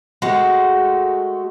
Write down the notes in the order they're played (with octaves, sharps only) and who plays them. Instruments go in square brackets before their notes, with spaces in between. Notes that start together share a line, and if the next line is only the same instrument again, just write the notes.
[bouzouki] G#3 A3 F#4 A4